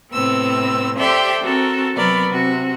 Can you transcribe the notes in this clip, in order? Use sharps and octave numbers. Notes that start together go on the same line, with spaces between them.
A2 C3 B3 C4 E6
G4 A4 C5 D5 E5 G5
C4 F#4 A4 A#4
C3 F#3 B3 A#4 D5 B5
C3 F#4